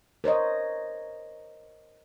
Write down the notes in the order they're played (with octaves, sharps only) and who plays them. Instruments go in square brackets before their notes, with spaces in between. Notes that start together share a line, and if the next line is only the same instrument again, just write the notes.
[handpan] A#4 C5 C#5 D#5